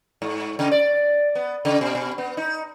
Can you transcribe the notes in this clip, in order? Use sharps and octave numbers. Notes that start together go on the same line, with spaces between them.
G#2
C#3
D5
B3
C#3
B2
B2
B3
D#4